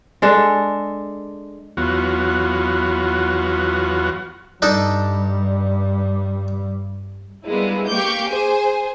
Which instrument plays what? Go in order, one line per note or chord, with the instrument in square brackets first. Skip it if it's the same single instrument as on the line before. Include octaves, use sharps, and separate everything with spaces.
[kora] G#3 D4 A4
[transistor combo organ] E2 F#3 B3 F4 F#4
[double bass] G2 G3 [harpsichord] D4 D#4 A4
[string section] G3 G#3 A#3 B3 D4 E4
A#3 G4 F5 C#6 D6 G6
G#4 C5 G#5